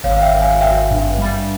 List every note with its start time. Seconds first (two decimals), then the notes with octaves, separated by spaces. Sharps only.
0.04 G#1 C#5 F5
0.16 F5
0.22 E5 G5
0.32 G#1
0.42 F5 G#5
0.61 G#1 E5 G5
0.91 G2
1.18 G3